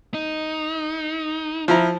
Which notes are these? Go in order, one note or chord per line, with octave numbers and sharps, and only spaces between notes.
D#4
F3 E4 A#5